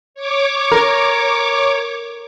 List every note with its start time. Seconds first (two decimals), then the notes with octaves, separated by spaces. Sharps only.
0.14 C#5 D6
0.72 A#4